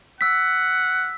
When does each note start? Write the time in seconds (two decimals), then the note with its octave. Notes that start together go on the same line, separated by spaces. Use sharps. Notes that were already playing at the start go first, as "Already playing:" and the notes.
0.21 F#5 E6 B6